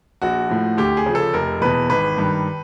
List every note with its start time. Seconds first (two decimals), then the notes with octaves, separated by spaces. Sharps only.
0.22 A#1 F#4
0.49 A2 F3
0.77 D2 G4
0.97 G#4
1.06 C#3 F3
1.15 A4
1.34 F1 A#4
1.61 E2 B2 B4
1.90 G#1 B4
2.18 G2 D#3